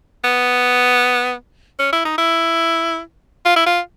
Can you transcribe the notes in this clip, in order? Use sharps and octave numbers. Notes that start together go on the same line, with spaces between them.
B3
C#4
E4
D#4
E4
F4
E4
F4